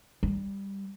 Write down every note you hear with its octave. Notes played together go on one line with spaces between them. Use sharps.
G3